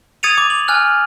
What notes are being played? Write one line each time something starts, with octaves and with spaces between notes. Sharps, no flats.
D#6 G#6 A6 C#7 D#7 F7
D6
F#7
G#5 F6 F#6